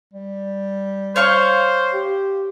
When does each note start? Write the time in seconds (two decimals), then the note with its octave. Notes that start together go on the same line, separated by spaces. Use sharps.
0.13 G3
1.16 C5 C#5 F5 C#6
1.93 G4